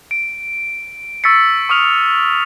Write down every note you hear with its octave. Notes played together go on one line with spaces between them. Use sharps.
D7
C#6 E6 A6 B6 C#7
C#6 D#6 F6 F7